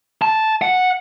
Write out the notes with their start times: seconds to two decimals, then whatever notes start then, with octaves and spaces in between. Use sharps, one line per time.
0.22 A5
0.62 F#5